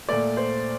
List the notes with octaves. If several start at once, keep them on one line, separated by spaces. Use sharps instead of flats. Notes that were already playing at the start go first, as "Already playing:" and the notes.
A#2 A3 D5
C5